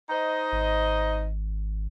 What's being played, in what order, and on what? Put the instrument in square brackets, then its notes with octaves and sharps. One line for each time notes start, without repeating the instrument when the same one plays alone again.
[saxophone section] D#4 C5 D#5
[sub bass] G#1